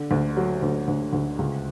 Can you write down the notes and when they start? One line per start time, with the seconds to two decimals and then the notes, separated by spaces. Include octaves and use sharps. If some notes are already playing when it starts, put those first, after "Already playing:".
Already playing: D3
0.11 D2
0.37 F#3
0.62 D2
0.88 D2
1.13 D2
1.39 C#2